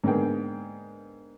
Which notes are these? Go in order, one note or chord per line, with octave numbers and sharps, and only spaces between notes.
G#2 D3 A#3 B3 G#4 G5